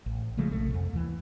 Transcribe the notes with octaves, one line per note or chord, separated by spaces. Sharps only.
A1
C#3 F3 G#3 A3
D#1 A#1 C3 A3
F2
D#2 E3